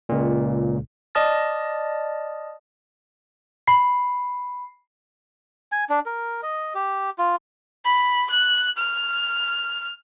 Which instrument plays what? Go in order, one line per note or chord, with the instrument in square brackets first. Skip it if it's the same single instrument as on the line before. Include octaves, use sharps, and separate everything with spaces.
[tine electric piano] C#2 A#2
[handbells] D5 D#5 A5 D#6 F6 A6
[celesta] B5 C7
[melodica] G#5
D4
A#4
D#5
G4
F4
[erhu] B5
F#6
F6